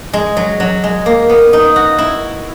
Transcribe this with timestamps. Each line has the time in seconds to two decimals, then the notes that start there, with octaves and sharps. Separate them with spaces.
0.13 G#3
0.37 F#3
0.60 F#3
0.84 G#3
1.06 A#3
1.29 B3
1.53 D#4
1.76 F#4
1.98 E4